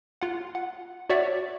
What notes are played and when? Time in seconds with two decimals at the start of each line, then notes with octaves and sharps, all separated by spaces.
0.21 F4 F#5
0.55 F#5
1.10 F#4 C#5 D5 E5 F#5